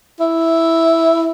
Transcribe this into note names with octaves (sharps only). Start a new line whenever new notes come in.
E4